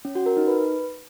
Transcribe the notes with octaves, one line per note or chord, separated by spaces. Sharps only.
C#4
F#4
A#4
D#4
B4